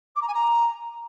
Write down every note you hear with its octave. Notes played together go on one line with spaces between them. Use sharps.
D6
A#5
G#5
A#5